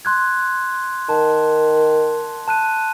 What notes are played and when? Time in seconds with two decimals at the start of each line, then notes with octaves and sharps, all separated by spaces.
0.05 C6 F#6 G#6
1.09 D#3 A5
2.48 A5 F#6 D#7